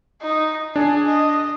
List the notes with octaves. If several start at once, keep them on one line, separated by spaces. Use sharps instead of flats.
D#4
D4 G#4
D#5